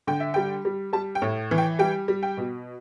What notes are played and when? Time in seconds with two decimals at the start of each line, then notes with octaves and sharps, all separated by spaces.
0.07 D3 G5
0.20 E5
0.34 G3 G5
0.65 G3
0.93 G3 A5
1.15 G5
1.22 A2
1.51 E3
1.58 G5
1.79 G3 G5
2.08 G3
2.23 G5
2.37 B2